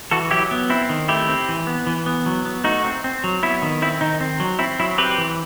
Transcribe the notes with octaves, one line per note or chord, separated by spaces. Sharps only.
E3 F#4 A4
F#3 E4 G4
B3
C4 E4
D#3
A3 E4 G4
C4
E3
B3
E3
B3
F#3
B3
A3 D#4 F#4
C4
C4
F#3
B3 E4
D#3
C4 E4
D#3 D#4
C4
F#3
C4 E4
F#3 E4
C4 G4 B4
E3